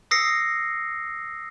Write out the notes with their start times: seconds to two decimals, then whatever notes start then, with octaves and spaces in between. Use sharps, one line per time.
0.11 D#6 E6 A#6 C7 C#7